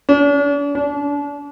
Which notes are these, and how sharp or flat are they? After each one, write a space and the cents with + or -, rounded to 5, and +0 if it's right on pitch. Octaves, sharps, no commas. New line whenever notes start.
D4 -45
D4 -35